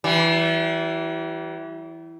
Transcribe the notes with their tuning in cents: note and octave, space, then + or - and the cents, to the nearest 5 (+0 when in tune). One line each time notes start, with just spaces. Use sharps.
E3 +0 G3 -40